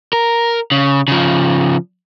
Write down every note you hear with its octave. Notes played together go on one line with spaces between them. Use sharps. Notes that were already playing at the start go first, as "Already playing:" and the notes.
A#4
C#3
C#3 F3